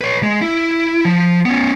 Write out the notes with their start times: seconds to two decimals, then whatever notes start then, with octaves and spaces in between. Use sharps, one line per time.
0.01 B4 C#5
0.23 G#3
0.41 E4
1.05 F3
1.45 B3 C#4